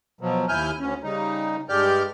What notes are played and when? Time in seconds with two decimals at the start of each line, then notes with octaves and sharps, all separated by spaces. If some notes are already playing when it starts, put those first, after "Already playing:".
0.21 B2 F3 F#3
0.49 D#2 E4 G#5 F6 G6
0.80 D2 C#4
1.03 C#3 G3 D#4
1.69 G2 G#3 G4 D5 F6 G6